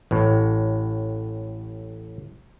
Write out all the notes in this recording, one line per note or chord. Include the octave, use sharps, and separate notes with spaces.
A1 A2